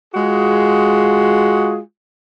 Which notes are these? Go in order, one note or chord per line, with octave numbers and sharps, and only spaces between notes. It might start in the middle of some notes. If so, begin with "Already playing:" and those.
G#3 F4 F#4 G#4